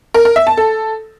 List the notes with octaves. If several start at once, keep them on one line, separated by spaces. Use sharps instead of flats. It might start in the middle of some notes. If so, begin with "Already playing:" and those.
A#4
A#4
E5
A5
A4